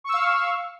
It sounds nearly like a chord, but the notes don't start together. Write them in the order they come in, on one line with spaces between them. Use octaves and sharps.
C#6 E6 F5